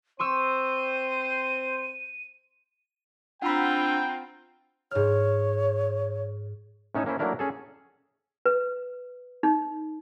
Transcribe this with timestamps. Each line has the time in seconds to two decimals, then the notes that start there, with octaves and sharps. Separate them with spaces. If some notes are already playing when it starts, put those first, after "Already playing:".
0.19 C4 C5 C6 C#6 E6 D#7
3.42 C4 D4 F4 F#5 G5 A#5 B5 E6
4.91 G#2 C#5 F6
6.95 A2 C#4 D#4 A4 G#5 A5
7.06 A#3 C#4 E4 C5
7.19 F#3 A3 A#3 D4 E4 A#4
7.39 C#4 G#4 A4
8.45 B4
9.43 D#4